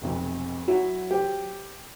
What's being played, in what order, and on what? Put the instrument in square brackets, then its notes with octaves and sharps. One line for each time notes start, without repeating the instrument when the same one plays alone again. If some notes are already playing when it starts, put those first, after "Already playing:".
[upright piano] F1 B1 F2
[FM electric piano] F#3 [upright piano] E4 F#4
[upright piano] G4 C5